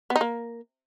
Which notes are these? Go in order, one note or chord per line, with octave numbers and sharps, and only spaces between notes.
B3
D#4
A#3